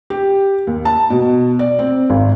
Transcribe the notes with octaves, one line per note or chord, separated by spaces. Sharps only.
G4
D#2
A5
B2
D5
C4
G#1